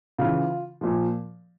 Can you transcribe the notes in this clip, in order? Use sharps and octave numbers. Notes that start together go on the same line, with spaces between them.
C#3 E3 F4
A#2 F3